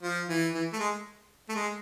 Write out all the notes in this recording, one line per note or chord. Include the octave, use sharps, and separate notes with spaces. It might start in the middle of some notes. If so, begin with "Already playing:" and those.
F3
E3
E3
A3
G#3
A3
G#3